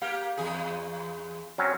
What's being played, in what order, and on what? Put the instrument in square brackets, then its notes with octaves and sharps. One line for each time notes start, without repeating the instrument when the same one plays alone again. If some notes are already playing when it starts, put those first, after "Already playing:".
[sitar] A#3 G4 [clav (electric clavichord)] F5
[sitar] E2 G#4
[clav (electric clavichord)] F#3 C4 C#4